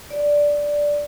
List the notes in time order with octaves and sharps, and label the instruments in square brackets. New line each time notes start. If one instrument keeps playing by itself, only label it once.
[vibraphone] D5